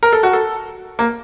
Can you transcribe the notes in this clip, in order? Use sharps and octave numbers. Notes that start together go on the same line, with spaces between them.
A#4
A4
F#4
A4
A#3